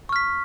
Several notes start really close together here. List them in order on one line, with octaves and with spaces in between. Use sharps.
C#6 F6 B6